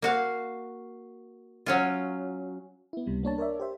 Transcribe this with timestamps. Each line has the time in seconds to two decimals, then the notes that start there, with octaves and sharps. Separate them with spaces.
0.02 A#3 F#4 F5
1.66 F#3 C#4 F4
2.93 B3 E4
3.06 C#2 C3 G3
3.23 A#3 D4 C#5 A5
3.38 A#4 C#5 D5 E5
3.60 G4 C5 E5